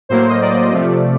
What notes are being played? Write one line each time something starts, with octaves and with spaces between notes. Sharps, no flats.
A2 F#3 A#3 C5
D#5
D5
C3 F3 A3